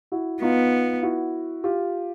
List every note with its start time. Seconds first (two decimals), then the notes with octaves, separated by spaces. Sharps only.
0.12 E4 F#4
0.42 B3 D#4 F4
1.03 E4 F#4
1.64 F4 G4